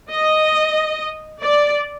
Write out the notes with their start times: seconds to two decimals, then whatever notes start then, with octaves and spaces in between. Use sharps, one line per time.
0.11 D#5
1.41 D5